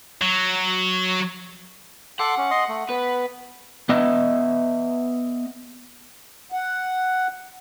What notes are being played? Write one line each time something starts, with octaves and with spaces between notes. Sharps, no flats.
F#3
A4 F#5 C6 D6
C#4
D#5 C6
A3
B3 B4
B3 D#5 E5
F#5